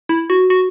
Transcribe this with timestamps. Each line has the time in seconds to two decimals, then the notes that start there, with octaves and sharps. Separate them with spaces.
0.09 E4
0.30 F#4
0.50 F#4